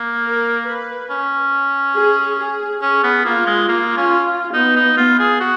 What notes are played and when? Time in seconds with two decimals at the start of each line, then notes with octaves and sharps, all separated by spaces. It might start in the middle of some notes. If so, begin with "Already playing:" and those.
Already playing: A#3
0.25 A#4
0.67 B4
1.10 C#4
1.96 G#4
2.39 G#4
2.82 C#4 G#4
3.04 B3
3.25 A#3 F4
3.47 G#3
3.69 A#3 F4
3.97 C#4
4.54 B3 D#4
4.76 D#4
4.97 B3 F4
5.19 G#4
5.40 F#4